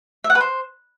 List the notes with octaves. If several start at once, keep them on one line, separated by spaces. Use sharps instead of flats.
E5
F#5
B4
C5